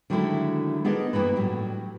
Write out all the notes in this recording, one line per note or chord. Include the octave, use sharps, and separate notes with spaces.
D3 D#3 F#3 G#3 A3 E4
B3 D4 D#4 G#4 A#4 D#5
G2 E3 A#3 B3 B4
A2 F#3 G3